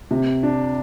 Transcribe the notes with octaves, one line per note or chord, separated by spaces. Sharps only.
C3
D4